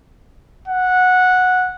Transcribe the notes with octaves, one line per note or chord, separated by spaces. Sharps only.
F#5